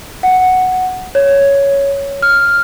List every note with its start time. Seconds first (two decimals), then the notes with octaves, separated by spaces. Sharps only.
0.23 F#5
1.15 C#5
2.22 F6